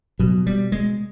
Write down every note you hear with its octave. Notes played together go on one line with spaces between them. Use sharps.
B2 F#3
G3
G#3